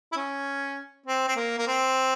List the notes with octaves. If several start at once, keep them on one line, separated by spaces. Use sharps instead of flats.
E4
C#4
C4
C4
A#3
A#3
C4